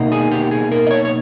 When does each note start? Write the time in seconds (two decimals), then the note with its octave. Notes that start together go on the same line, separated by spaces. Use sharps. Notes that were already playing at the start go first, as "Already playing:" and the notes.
Already playing: B2 A#3 D#4
0.12 G#4
0.32 G4
0.51 G#4
0.72 A#4
0.87 D#5
0.91 C#5
1.05 C#5